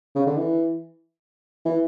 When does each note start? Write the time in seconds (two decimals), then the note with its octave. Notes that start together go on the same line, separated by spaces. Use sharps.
0.15 C#3
0.27 D3
0.37 E3
1.65 E3